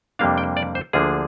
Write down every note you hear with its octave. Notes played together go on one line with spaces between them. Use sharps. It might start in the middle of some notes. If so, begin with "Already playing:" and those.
F2 C3 G3 A#3 D4 F5
G5
D5
C5
D2 D3 F3 A#3 D4 G#4